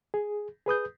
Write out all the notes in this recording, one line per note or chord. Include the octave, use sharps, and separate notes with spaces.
G#4
G#4 B4 D#6 G6